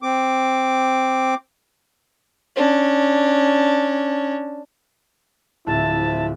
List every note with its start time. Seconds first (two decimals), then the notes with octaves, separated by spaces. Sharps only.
0.03 C4 D6
2.56 C#4 D4
5.67 D1 F3 C4 E4 E5 A5